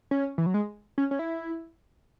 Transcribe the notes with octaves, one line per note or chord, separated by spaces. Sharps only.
C#4
E3
F#3
G#3
C#4
C#4
E4